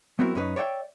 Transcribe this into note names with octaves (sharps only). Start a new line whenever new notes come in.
F#3 B3 C4 E4 F#4 A#4
F#2 C#4 D#4 G4 B4
C#5 D5 E5 F#5 G5